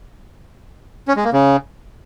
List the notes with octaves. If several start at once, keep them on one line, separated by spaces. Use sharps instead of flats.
C#4
G#3
A#3
C#3